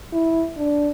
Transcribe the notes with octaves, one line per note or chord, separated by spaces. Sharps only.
E4
D4